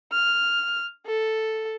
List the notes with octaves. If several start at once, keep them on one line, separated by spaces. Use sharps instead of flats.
F6
A4